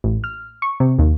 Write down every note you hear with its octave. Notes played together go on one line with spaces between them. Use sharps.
A1
F6
C#6
C3
D#2